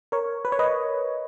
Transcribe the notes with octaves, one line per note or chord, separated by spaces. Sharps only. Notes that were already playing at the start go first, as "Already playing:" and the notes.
A#4 C#5
B4
C#5
B4 D#5